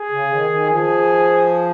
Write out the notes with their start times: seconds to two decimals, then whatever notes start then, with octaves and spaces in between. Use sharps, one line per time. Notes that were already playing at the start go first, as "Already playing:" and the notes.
Already playing: G#4
0.11 C#3
0.30 D#3
0.50 D#3
0.69 F3 G#4